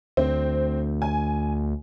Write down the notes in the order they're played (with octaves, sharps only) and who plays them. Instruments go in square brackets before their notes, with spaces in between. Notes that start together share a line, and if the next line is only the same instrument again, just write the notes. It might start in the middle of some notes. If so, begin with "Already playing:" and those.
[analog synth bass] D2 [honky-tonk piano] C4
[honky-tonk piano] G#5